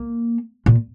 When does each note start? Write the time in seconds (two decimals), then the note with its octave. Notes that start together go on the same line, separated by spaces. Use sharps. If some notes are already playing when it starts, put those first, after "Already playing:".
Already playing: A#3
0.66 A#2